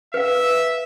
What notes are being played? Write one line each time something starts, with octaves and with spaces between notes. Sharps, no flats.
B4 E5 F5